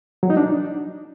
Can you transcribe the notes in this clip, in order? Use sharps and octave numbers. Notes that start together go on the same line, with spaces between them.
F#3
D#4
D4